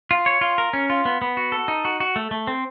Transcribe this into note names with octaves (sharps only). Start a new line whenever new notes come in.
F4
C#5
F4
A#4
C#4
F4
B3
B3
F#4
A4
D#4
F#4
F#4
A3
A3
C4